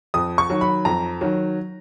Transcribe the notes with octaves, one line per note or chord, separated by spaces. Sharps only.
F2 D#6
C#6
D#3 F#3
B5
F2 A#5
D#3 F#3